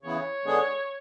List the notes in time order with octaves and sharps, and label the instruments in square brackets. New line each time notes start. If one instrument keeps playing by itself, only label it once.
[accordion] C#3 E3 B3 E4 [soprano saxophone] C#5
[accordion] D3 G#3 B3 D4 G#4